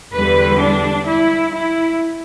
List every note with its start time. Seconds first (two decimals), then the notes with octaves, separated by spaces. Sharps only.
0.15 E2 D3 G3 B4
0.61 D4
1.07 E4
1.53 E4